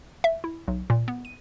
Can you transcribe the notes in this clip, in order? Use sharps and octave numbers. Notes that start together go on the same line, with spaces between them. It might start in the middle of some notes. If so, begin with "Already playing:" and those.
E5
E4
B1
A#2
B3
D#7